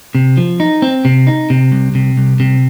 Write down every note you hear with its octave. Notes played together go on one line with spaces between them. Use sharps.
C3
F3
D#4
C4
C3
D#4
C3
C2
C3
C2
C3